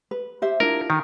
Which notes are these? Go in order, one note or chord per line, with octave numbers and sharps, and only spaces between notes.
B4
G4 C5 E5
D4 E4 F4 A#4
D#3